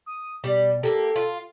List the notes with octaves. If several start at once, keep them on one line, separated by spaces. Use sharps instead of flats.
D#6
B2 G3
A#3 G4 A4
F4